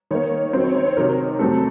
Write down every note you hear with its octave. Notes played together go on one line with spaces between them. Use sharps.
D#3 A#3 C#5
D#3 F#3 C4 C5
C#5
C#5
C5
C3 D#3 F#3 A#4
C3 F#3 A3 C4 A4